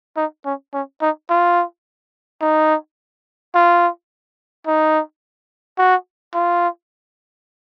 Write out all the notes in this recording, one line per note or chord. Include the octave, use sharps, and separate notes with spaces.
D#4
C#4
C#4
D#4
F4
D#4
F4
D#4
F#4
F4